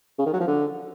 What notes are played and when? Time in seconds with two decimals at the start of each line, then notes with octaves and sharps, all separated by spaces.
0.19 C#3
0.26 D#3
0.33 F#3
0.40 F3
0.47 D3